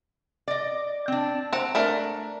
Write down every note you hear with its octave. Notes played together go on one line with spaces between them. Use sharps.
D5 D#5
C4 D4
C4 F#5 A#5
A3 D4 A#4